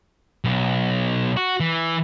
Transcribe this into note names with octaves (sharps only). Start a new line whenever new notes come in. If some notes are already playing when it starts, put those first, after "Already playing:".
B1
F#4
E3